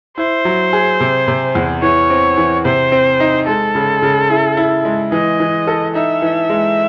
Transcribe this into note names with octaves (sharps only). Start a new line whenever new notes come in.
E4 C5
F#3
G#4
C3
C3
E2
E3 C#5
C4
E3
C3 C5
C4
D#4
G#3 A4
C#3
C#3
E4
E4
G#3
E3 D#5
E3
A4
D#4 E5
E3
G#3